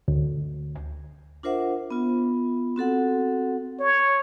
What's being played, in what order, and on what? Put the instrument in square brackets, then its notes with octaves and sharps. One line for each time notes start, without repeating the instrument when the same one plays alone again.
[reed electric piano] D2
[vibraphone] D4 F4 A#4 C5 E5 F#5
B3 F4
C4 F#4 A4 F#5
[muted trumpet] C#5